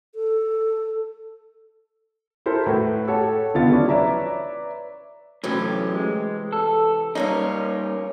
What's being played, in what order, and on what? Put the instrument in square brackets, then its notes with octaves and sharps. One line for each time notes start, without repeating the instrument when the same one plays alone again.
[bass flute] A4
[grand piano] E4 A4 A#4 C5
A2 F#4 B4
G4 A4 C#5 F#5 A5
D#1 C#2 D3 B3 F4 A6
F3 F#3 C#4 D4 E4
B4 C#5 D5 E5 A#5
[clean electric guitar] A2 F#3 C#4 [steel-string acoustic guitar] C3 E3 G4
[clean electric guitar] G#3
A4
[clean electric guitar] G3 A#3 D#4 [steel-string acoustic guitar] C#4 A#4 C#5